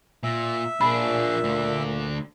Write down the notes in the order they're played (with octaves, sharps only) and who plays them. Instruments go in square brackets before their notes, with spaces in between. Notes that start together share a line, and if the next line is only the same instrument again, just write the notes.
[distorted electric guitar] A#2 [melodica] E5
[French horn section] A#2 [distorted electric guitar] D4 G#4 [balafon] B5
[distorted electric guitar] D2 D3